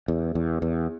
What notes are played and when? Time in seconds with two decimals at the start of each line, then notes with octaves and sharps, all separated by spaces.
0.08 E2
0.35 E2
0.62 E2